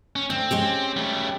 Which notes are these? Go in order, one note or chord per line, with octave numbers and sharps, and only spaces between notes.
C#4
D2 C4
G#3 C#4 G4
G3 A3